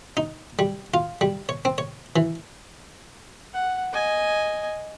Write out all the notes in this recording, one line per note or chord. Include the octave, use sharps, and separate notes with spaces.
D#4
G3
F4
G3
C#5
C4
C#5
E3
F#5
D#5 G#5